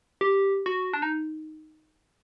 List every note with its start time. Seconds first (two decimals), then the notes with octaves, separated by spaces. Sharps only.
0.21 G4
0.66 F#4
0.93 D4
1.02 D#4